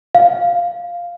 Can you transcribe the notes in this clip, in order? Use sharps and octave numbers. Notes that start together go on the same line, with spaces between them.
F5